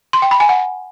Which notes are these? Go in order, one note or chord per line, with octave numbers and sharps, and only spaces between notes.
C6
G5
B5
G#5
F#5